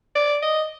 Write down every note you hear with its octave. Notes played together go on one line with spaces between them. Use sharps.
D5
D#5